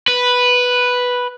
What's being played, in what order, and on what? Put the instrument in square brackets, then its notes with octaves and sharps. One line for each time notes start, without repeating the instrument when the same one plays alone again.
[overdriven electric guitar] B4